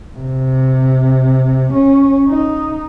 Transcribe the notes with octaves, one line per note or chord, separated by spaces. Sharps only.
C3
C#4
D#4